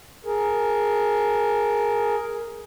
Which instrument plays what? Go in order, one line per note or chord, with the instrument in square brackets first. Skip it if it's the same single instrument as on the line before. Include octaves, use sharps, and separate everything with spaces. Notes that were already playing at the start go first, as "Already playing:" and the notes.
[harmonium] G#4 A#4